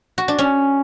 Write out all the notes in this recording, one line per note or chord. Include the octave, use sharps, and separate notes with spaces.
F#4
D4
C#4